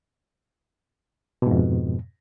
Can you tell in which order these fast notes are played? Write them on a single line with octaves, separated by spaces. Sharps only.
B2 G#2 F2